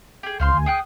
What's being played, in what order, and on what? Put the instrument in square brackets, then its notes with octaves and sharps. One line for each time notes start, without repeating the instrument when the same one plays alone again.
[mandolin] G4 G#4
[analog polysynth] C#2 [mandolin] C5 F5 C6
[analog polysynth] D2 G#5
[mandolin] G#4 G5 F#6 [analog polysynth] D#6